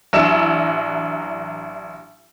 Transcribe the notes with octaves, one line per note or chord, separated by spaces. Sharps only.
A1 F#3 D4 E4 E6 E7